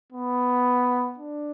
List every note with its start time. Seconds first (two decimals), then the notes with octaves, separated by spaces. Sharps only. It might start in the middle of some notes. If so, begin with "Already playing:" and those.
0.13 B3
1.18 D4